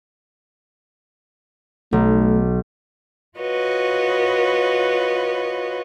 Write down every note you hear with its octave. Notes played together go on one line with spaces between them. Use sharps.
B1 A3
F4 F#4 B4 C#5 D#5